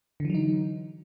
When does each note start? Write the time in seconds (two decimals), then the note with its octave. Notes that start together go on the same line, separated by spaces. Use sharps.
0.20 D3
0.25 E3
0.30 F#3
0.35 D#4